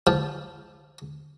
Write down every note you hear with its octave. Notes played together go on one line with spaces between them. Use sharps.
F3